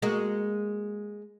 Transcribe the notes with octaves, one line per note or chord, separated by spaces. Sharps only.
G#3 A#3 F#4